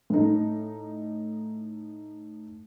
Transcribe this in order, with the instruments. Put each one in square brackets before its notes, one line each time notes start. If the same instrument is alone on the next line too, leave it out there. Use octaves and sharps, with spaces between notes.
[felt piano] A2 D#4